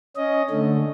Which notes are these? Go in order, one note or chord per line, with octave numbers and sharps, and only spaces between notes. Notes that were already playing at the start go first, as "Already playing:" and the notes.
C#4 D#5
D3 A3